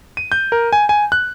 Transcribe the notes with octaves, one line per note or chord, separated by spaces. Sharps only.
D#7
G6
A#4
G#5
G#5
F#6